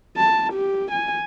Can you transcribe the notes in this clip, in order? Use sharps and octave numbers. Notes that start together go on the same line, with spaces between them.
A5
G4
G#5